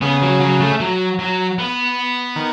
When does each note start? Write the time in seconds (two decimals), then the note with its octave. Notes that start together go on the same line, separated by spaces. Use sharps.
0.01 C#3 B3
0.22 F#3
0.40 F#3
0.60 A3
0.80 F#3
1.19 F#3
1.58 B3
2.36 D#3